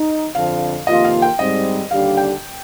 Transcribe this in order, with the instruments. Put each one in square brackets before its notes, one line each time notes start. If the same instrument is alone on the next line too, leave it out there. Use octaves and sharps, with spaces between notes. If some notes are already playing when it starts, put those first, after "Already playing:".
Already playing: [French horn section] D#4
[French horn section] F2 D3 F3 [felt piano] F5
[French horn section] F2 C3 D#3 A#3 F4 [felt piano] D#5
[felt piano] F5
G5
[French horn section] G#2 G3 C4 [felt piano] D#5
[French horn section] D#2 D3 G3 D4 G4 [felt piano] F5
[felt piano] G5